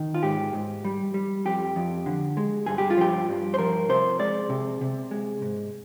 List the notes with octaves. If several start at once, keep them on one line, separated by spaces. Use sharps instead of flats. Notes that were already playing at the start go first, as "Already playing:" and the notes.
Already playing: D#3
F4
G#2 G4
G#2
G3
G3
F2 G4
F2
D3
G#3
G2 G#4
G4
F4
F3 G4
G2
C5
F3 A#4
C3 C5
G#3 D5
C3
C3
G#3
G#2